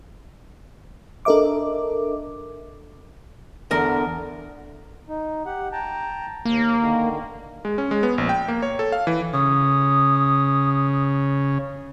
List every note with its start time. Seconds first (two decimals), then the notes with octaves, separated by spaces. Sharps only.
1.25 D4 A4 A#4 D#5 E5 D6
3.71 E2 D3 A#4
5.08 D#4
5.46 G4 F#5
5.72 G5 A5 A#5
6.45 D#2 A#3
6.80 D3 D#3
7.65 G#3
7.78 C#4
7.91 G#3
8.03 B3
8.18 A#1
8.29 G5
8.48 A#3
8.62 C#5
8.79 A4
8.92 F5
9.07 E3
9.33 C#3 D#6